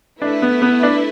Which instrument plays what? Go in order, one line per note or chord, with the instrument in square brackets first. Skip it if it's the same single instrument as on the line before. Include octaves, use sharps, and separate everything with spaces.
[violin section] A3 E4 B4 E5 [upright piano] D4
[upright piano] B3
B3
D4